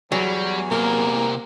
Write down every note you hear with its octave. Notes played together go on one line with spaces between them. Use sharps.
E2 F#3 G3
C3 A#3 A#4